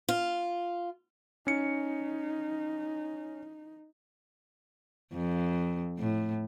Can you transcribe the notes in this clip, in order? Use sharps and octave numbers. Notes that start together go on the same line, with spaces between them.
F4
C#4 D#4 C#7
F2
A2